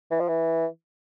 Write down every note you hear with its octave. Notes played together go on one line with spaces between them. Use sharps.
E3
F3
E3